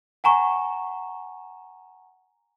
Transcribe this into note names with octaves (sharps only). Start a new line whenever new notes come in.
F#5 G#5 A#5 C#6